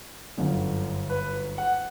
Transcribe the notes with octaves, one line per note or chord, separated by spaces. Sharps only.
G1 F#2 D3
B4
F#5